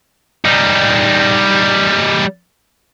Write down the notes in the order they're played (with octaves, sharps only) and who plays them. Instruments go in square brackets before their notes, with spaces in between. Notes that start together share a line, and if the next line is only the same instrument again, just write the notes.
[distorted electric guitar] G3 D#4